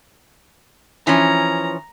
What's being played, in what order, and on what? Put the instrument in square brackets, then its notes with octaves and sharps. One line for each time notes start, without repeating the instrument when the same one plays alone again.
[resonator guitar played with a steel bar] E3 F3 C#4 [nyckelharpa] A#5